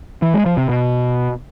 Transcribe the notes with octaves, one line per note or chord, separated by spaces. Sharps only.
E3
G#3
F3
C3
B2